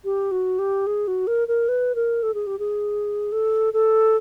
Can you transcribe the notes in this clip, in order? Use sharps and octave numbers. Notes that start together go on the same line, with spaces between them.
G4
F#4
G4
G#4
F#4
A#4
A#4
B4
A#4
A4
G#4
G4
G#4
A4
A4